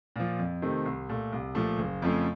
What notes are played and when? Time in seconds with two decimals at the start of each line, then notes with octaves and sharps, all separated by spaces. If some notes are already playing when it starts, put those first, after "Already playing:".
0.16 A#2 F3
0.39 F2
0.62 C3 D#3 A3 C4
0.85 C2
1.09 A#2 A3
1.32 C2
1.55 A#2 F3 A3
1.78 F#1
2.02 F2 C#3 F3 A3